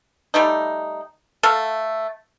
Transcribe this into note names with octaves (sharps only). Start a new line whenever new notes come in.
G3 A3 D#4
A3 A4 F5